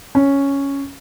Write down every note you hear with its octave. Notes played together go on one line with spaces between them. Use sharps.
C#4